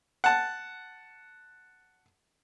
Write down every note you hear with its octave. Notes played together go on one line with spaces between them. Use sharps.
F#5 A5